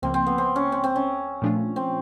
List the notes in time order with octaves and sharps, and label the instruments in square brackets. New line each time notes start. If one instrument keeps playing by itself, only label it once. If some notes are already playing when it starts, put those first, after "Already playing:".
[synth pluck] C#2 C#3 F3 A#3 [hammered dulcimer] C4
[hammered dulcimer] C4
B3
C4
C#4
C4
C4
C#4
[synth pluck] A#2 F3 A3 D4 F4
[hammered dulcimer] C4